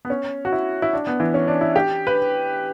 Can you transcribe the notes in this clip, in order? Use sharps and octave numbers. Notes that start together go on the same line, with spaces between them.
B3
C#4
F#4
E4
E4
D4
B3
E3
C#4
D4
E4
G4
B4